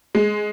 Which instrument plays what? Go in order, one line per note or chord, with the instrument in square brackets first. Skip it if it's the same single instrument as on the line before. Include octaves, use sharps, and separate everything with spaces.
[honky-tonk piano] G#3